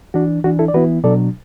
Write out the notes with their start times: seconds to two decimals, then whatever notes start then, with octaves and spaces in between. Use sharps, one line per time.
0.14 E3 D4 F#4
0.44 E3 D4 F#4
0.59 E4 A4
0.68 D5
0.74 E3 B3 E4 F#4 B4
1.04 B2 F#3 D4 A4 D5